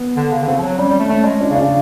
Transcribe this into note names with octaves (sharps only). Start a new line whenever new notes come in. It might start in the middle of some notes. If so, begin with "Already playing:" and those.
Already playing: B3
D3
C#3
D3
C#3 C4
F3
F#3
G3 C#4
G3
A3
A3 C#4
G#3
D4
C#3
D4
C#3